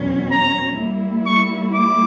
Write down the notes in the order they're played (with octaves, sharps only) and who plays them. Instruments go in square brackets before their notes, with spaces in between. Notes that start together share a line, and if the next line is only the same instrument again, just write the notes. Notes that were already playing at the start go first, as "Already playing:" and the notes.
Already playing: [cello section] E2 B2 F#3 C#4
[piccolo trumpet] A#5
[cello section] G3 A#3 E4
[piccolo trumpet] C#6
D6